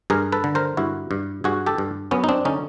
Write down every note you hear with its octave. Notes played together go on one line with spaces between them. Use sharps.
G2 G#4 A#4
A4 B4
D3
A#4 C5
G2 E4 F#4
G2
G2 F#4 G#4
G4 A4
G2
F#2 B3 C#4
D#4
C4 D4
D3 C#4 D#4